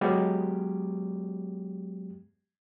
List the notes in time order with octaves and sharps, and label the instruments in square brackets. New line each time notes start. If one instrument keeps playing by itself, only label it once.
[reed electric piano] F#3 G#3 B3 G4